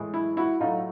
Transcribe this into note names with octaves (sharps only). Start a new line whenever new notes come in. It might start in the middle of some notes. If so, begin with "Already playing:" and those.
Already playing: A2 E3 G#3
E4
E4 F#4
A2 F#3 A3 D#4 F4